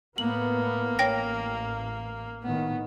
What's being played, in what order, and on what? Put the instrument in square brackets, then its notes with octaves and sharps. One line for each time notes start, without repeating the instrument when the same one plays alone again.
[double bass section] A2 B3 [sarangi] A#3 [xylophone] F#7
[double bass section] A1 [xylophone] C#5 G5 A#6
[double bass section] A2 D#3 [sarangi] B3